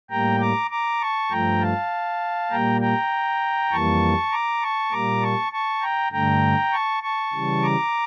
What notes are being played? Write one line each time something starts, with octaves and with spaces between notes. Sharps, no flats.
A2 G3 A#3 G5 A#5
A#5 D6
A#5 D6
A5 C#6
G2 F3 A3 G5 A#5
F5 A5
A#2 G3 A#3 G5 A#5
G5 A#5
F2 E3 G3 A#3 A5 C#6
A#5 D6
A5 C#6
A#2 G3 A#3 A#5 D6
A5 C#6
A5 C#6
G5 A#5
G2 D3 A3 G5 A#5
A5 C#6
A5 C#6
C#3 E3 G3
A#5 D6